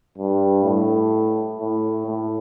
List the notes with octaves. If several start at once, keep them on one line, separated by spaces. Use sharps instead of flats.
G2
A2
A2
A2